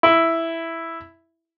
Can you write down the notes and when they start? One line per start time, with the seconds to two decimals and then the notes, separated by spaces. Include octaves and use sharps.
0.03 E4